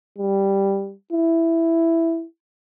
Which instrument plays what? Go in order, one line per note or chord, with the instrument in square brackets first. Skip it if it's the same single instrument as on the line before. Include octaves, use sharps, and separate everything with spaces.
[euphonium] G3
E4